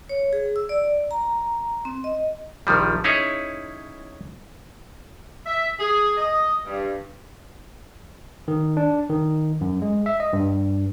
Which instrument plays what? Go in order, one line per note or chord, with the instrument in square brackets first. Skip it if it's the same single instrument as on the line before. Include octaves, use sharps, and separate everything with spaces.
[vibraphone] C#5
G#4
E6
D5
A#5
C4
D#5
[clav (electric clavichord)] A#1 D#3 F3 G3
C#4 D#4 E4 G#4 C#5
[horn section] E5
G#4
D#5
G2
[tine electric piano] D#3
D4
D#3
F#2
G#3
E5
D#5
G2